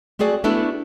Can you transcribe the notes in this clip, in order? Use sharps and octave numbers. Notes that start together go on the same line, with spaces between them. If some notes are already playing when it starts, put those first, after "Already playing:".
A3 C4 F#4 G#4 D5
A3 B3 D4 E4 F#4 A4